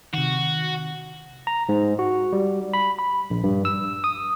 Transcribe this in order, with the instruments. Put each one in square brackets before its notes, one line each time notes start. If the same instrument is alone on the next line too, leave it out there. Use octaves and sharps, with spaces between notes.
[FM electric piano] C3 D#3 [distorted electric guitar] F#4
[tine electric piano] A#5
G#2
F#4
G3
B5
B5
A#1
G2
E6
D#6